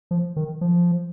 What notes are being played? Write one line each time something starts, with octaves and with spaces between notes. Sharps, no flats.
F3
D#3
F3